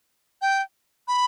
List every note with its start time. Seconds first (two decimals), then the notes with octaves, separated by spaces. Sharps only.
0.42 G5
1.08 B5